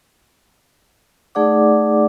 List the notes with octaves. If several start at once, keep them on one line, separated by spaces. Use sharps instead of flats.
A3 D#4 G#4 D5 F#5 D6